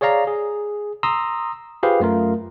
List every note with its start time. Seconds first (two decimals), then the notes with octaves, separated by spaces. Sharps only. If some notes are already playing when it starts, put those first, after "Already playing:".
0.01 G#4 C#5 D5 F5 A#5
0.27 G#4
1.03 A#5 C6 D#6 E6
1.83 F4 G4 G#4 B4 C5 F5
2.00 F#2 A3 F4 A#4